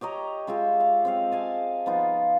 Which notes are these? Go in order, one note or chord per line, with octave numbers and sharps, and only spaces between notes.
G4 C#5 D#5 A#5
G#3 F4 G4 E5
F5
C4 D#5 F5
F5 G#5 A5
F3 B3 D#4 F4